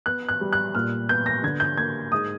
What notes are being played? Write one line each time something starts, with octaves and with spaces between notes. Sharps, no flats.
B3 F#6
F#6
G3
F#6
A#2 F6
B3 G6
A#6
D3 G#6
G6
A#3 G#6
G#2 D#6